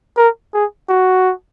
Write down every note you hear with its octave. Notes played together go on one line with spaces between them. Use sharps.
A#4
G#4
F#4